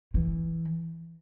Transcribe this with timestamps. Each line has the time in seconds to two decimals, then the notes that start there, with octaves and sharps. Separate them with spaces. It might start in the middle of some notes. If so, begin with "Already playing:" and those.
0.14 E3